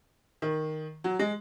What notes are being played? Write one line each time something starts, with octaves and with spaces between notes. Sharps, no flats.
D#3
F#3
G#3